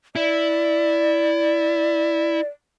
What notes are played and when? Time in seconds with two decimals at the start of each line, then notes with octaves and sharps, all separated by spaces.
0.16 E4 D5